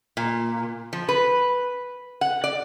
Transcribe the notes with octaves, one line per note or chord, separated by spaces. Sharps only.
A#2
F3
B4
F#5
D5